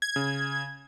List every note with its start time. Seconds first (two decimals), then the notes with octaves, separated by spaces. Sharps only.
0.02 G#6
0.16 C#3